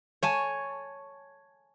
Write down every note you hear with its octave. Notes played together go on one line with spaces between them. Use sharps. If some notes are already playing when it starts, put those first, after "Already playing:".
C#5 G#5 A5